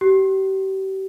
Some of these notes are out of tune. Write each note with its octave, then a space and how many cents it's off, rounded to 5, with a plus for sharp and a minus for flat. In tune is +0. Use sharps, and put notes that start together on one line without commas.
G4 -35